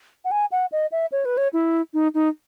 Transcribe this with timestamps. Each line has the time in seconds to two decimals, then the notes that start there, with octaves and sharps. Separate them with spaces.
0.25 F#5
0.31 G#5
0.52 F#5
0.72 D#5
0.92 E5
1.12 C#5
1.25 B4
1.37 C#5
1.53 E4
1.93 D#4
2.14 D#4